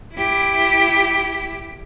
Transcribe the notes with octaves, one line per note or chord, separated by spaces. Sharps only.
E4 G4